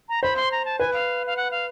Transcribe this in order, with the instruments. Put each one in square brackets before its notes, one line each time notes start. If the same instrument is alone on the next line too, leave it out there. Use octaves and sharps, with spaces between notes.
[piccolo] A#5
[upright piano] C5 [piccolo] B5
[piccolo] C6
A#5
A5
[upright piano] B4 [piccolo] G#5
[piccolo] F5
F5
F#5
F5